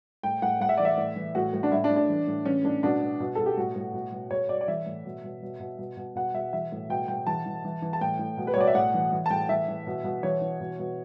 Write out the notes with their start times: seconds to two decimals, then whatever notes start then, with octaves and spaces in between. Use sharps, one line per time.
0.23 A2 G5
0.42 A2 F#5
0.60 A2 F#5
0.69 E5
0.78 E3 D5
0.85 E5
0.97 A2
1.16 E3
1.35 A2 F#4
1.53 A2
1.63 D4
1.71 A2 E4
1.84 D4
1.90 A2
1.96 D4
2.09 E3
2.27 A2
2.45 E3 C#4
2.64 A2 D4
2.83 B2 D4
3.02 B2
3.20 B2
3.35 B2 A4
3.46 G4
3.57 A2 F#4
3.76 A2
3.93 B2
4.12 B2
4.31 B2 C#5
4.49 B2 D5
4.61 D5
4.68 E3 E5
4.86 A2
5.05 B2
5.24 B2
5.42 B2
5.60 B2
5.79 B2
5.97 B2
6.15 B2 F#5
6.34 B2 E5
6.53 E3 E5
6.72 A2
6.89 B2 G5
7.08 B2 G5
7.27 E3 A5
7.46 E3
7.65 E3
7.82 E3
7.93 A5
8.01 A2 G5
8.19 A2
8.37 B2
8.47 B4
8.54 C#5
8.56 B2 D5
8.67 E5
8.74 A2 F#5
8.94 E3
9.12 E3
9.26 A5
9.30 A2 G5
9.49 E3 E5
9.68 E3
9.87 B2
10.04 B2
10.23 E3 C#5
10.42 E3
10.60 B2
10.79 B2